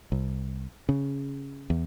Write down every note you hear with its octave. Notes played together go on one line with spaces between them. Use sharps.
C2
C#3
E2